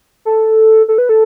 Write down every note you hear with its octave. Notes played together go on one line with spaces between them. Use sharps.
A4
A4
B4
A4